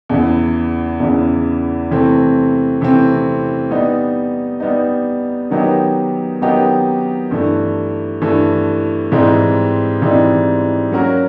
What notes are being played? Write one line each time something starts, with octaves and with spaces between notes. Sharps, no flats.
E2 C#3 E3
E2 C#3 E3
C3 E3 A3 C4
C3 E3 A3 C4
G3 B3 D#4
G3 B3 D#4
D#3 F#3 B3 D#4 G4
D#3 F#3 B3 D#4 G4
G2 E3 A3
G2 E3 A3
G#2 E3 G3 C4 D#4
G#2 E3 G3 C4 D#4
F#3 A#3 C#4 F#4 A#4